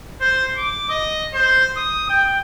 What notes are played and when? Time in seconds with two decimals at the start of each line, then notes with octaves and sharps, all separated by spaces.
0.21 C5
0.57 D6
0.89 D#5
1.33 C5
1.77 D#6
2.09 G5